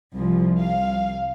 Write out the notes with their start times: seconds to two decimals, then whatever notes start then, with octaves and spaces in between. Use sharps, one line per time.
0.16 C2 F3
0.59 F5